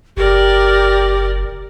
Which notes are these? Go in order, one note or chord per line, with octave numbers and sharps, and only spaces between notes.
F#1 G4 A#4 D5